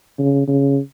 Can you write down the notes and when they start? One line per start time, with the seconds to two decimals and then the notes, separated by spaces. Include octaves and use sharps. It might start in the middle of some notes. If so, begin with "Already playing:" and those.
0.18 C#3
0.47 C#3